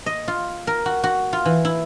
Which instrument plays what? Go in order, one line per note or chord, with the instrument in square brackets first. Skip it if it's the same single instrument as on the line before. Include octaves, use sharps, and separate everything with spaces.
[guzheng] D#5
F4
A#4
F#4
F#4
F4
E3
E4